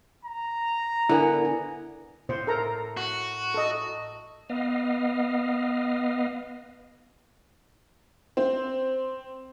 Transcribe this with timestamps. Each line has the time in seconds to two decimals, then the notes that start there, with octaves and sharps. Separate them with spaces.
0.25 A#5
1.09 D3 B3 E4 A#4 G#5
2.29 A2 C5
2.47 A4 A#4 A#5
2.97 F#4
3.54 A4 D#5
4.49 B3 D#5 F5
8.37 C4